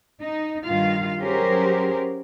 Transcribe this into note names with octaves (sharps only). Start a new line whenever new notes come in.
D#4
G2 D#3 F4 F5
F#3 C#4 G4 G#4 A#4 C5